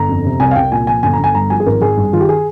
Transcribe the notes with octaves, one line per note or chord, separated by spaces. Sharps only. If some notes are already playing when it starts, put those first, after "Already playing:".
Already playing: G1 A#5
F2
C3
C2 G#5
F5
C2 G5
A#2 G#5
F3 G#5
G1 G#5
A#5
G1 G#5
G2 A#5
F3 G#5
G#4
G#1 A#4
G#1 G#4
G2
D#3 F4
G4
G#4